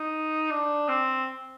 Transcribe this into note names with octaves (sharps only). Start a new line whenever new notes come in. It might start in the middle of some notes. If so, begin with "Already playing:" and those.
Already playing: D#4
D4
C4